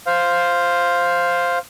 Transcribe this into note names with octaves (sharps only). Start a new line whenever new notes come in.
C5 F5